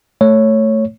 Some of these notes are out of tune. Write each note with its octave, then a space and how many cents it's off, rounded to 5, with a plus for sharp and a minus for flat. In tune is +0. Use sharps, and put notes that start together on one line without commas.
A3 +0 C#5 +0